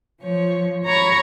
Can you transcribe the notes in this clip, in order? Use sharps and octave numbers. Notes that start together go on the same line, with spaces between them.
F3 C#5
C#5 A#5 B5 C#6